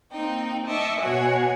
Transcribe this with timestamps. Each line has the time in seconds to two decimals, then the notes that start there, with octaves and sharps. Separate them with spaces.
0.11 A#3 C4 D#4 G5
0.66 D#5 E5 A5 C#6 D6
0.99 B2 F#4 C#5 F#5 G#5